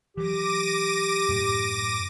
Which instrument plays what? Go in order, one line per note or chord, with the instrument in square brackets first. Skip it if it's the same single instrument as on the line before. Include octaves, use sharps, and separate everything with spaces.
[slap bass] E3 F#3 [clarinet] G4 [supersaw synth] D6 A#6 D#7
[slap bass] F#2 A2 C3